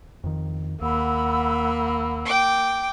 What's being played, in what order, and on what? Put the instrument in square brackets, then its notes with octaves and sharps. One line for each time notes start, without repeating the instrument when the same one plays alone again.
[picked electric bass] F2 D#3
[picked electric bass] D#2 [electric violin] A#3 [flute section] F#5 B5 E6
[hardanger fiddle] G5 D6